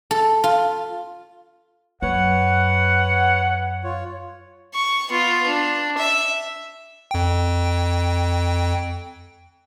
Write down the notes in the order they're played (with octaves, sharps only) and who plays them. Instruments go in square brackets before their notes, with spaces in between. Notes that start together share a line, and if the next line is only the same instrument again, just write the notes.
[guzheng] A4
F4
[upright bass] F#2 [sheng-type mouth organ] B4 C#5 [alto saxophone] F#5
[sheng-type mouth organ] F4 C#5
[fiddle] C#6
B3 F4
D4
E5
[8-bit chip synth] F2 G5